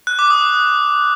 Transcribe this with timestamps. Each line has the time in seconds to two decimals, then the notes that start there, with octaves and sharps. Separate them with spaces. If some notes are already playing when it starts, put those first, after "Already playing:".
0.07 F#6
0.19 D6
0.30 D#6